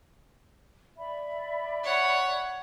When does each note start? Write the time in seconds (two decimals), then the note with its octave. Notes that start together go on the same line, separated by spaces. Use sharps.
0.98 D5 E5 B5
1.83 C#5 F#5